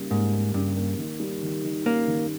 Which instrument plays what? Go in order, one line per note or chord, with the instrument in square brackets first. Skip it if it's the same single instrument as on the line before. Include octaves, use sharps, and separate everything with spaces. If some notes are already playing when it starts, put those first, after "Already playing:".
Already playing: [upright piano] C#3 G3 A#3
[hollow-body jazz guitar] G#2 [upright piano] A#3
[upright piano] A#3
[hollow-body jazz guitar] G2 [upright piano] C#3
[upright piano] A#3
D#3
G3
D#3
D#3
[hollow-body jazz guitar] A#3 [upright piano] C#4
[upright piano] D#3